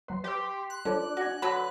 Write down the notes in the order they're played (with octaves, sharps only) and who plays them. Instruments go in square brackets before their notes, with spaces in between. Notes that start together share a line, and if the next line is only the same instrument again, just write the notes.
[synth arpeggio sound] F#3 B4 [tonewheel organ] C6
[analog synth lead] G4 [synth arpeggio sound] B4 E6
[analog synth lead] F#6
[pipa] F3 [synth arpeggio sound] G3 A4 C#5 [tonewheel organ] D4 D5
[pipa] F#4 G#5
[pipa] D3 F#3 B4 [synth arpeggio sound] F#4 D#6 [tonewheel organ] B5